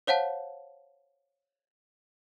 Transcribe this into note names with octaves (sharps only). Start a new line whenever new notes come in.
C5 C#5 F5 F#5 A5